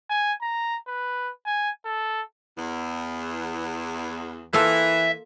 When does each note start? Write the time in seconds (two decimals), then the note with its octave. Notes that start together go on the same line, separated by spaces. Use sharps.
0.10 G#5
0.42 A#5
0.87 B4
1.46 G#5
1.85 A4
2.58 E2
4.53 E3 A#3 F4 A4 E5